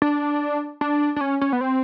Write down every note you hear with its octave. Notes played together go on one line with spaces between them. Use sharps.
D4
D4
D4
C#4
C#4
B3
C4